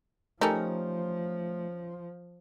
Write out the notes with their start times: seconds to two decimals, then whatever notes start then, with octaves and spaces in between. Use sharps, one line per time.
0.41 F3 G3 A3 C#4 D#4 A4 A#4